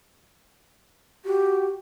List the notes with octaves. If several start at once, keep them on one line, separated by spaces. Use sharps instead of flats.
F#4 G4